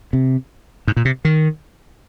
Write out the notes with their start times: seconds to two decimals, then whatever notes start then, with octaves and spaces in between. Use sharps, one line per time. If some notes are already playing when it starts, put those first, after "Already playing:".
0.13 C3
0.87 G#2
0.97 A#2
1.05 C3
1.25 D#3